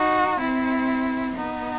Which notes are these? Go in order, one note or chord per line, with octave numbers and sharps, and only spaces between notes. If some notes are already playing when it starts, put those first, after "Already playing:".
Already playing: D#4 F#4
C4 E4
B3 D#4